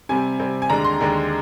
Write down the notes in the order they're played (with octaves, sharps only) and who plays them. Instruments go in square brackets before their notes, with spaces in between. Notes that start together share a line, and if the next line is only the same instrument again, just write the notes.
[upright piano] C3 G3 C4 G#5
C3 G3 C4
G#5
D#2 D3 G#3 D4 A#5
C6
D#2 D3 G#3 D4